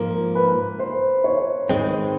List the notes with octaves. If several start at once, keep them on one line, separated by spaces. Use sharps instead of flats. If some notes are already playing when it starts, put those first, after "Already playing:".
Already playing: G#2 F3 A#3 A#4
B4
C5
C#5
G#2 D#3 G#3 C4